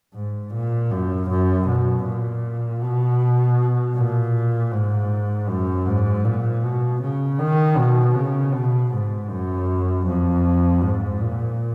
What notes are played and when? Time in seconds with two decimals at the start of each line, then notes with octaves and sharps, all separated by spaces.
0.14 G#2
0.53 A#2
0.91 F#2
1.30 F#2
1.68 B2
2.05 A#2
2.82 B2
3.95 A#2
4.72 G#2
5.48 F#2
5.87 G#2
6.24 A#2
6.63 B2
7.02 C#3
7.38 D#3
7.77 B2
8.16 C#3
8.54 B2
8.92 G#2
9.29 F#2
10.05 F2
10.83 G#2
11.21 A#2